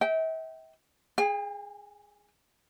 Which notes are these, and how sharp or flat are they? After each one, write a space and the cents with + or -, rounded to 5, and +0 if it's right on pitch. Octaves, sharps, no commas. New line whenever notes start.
E5 -40 G5 -20
G#4 +0 G5 +45